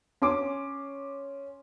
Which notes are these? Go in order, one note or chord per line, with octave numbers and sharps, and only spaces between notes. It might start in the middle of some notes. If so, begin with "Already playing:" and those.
C#4 C6 D6